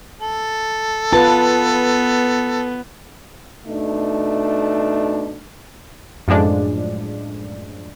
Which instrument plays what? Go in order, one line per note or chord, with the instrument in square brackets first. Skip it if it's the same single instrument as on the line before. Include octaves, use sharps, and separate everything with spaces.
[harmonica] A4
[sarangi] B3 [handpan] F4 B4 [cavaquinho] A5
[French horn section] B2 A3 D4 D#4
[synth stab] F#2 A2 F3 G#3 D4